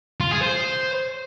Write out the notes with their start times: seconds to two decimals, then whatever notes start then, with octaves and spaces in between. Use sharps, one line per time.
0.20 F4
0.31 G#4
0.42 C5